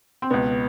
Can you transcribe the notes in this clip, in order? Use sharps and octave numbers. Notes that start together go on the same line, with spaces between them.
C4
C#2 B2 B3